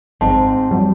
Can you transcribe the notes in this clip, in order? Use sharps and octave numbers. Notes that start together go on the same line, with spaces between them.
G#1 G#2 C4 A5
F2 F#3 G3